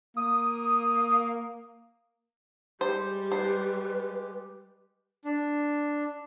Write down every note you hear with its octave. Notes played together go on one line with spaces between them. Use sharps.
A#3 D#6
G3 G#3 G4 C5
B4 C5
D4